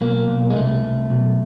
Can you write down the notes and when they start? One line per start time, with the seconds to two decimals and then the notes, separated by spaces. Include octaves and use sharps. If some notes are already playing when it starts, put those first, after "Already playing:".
0.01 B1 A#3
0.28 B1
0.50 G#3
0.56 C2 A3
0.83 C2
1.10 B1